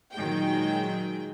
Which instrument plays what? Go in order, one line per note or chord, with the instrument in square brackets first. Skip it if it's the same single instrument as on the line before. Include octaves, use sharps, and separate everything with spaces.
[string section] A#2 D#3 F#3 G#3 G#4 G5